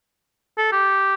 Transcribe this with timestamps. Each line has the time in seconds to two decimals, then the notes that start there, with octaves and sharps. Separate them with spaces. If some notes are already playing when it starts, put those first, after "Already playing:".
0.58 A4
0.72 G4